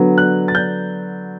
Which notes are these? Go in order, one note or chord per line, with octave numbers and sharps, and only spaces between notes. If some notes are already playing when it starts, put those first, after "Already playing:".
Already playing: D3 F#3 B3
F#6
A6
G6